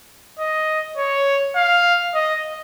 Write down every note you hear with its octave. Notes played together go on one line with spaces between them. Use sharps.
D#5
C#5
F5
D#5